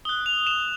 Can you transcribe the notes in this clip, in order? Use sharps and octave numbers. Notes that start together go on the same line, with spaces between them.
D#6 F#6 G7
F7
E7